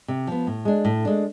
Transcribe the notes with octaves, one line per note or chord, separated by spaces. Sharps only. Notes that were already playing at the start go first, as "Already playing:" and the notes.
C3
F3 B3
A2
G#3 D4
A2
G#3 D4